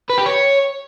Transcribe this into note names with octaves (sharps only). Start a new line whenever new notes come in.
B4
G4
C#5